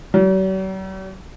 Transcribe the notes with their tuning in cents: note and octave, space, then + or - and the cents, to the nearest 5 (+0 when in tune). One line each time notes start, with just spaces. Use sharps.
F#3 +45